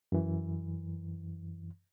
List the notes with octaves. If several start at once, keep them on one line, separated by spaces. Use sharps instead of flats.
F#2 E3